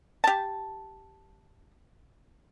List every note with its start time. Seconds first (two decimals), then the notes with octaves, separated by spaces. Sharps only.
0.24 G4 A5